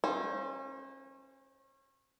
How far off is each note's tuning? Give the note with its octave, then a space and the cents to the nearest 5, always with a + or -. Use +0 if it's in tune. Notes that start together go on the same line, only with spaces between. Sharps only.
C#4 -35 C5 -5